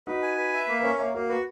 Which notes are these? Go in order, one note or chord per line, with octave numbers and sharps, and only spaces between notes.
D#4 F#4 B4
G#5
B4
E5
A#3
B4
C#4 A#4 C#5
A#3 C#5 E5
A#3 F#4 A#4
F#4 B4